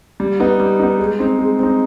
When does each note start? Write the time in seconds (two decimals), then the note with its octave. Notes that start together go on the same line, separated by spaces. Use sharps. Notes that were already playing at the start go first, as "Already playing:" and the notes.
0.20 G3
0.40 B3 D#4
0.60 G3
0.80 B3 D#4
0.99 G#3
1.19 C4 D#4
1.39 G#3
1.59 C4 D#4